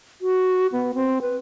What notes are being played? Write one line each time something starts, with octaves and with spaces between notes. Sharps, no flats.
F#4
B3
C4
B4